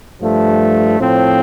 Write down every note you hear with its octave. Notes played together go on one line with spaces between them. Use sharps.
G2 F3 A3
A2 F3 C4